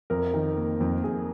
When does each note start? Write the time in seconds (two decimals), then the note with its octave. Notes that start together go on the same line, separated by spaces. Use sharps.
0.10 F2 A#4
0.34 D#3
0.57 A#3
0.81 F2
1.03 F2 G#4